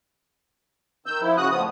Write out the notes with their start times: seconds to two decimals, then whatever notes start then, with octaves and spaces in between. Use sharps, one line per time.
1.06 D#3 E6 G6
1.21 F3 E4
1.37 C#3 F#4 D#6 F#6
1.50 F2 A2 F3 B3 D#6